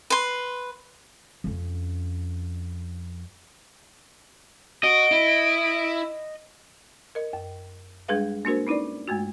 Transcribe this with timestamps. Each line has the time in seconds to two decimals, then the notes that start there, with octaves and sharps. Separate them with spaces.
0.10 B4 C6
1.44 F2 C#4
4.84 F#4 D#5 D7
5.11 E4
7.15 A#4 D#5
7.33 F#2
8.08 G3 G#3 D4 G#4 B4 F5
8.45 A#3 D4 F#4 A#4 C5
8.67 C#4 D#4 E4 B4 D5
9.08 G2 G#3 A3 F#4